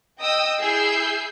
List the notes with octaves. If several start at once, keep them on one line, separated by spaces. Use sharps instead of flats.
D#5 G5 D#6 E6
E4 G#4 E6 G6 C7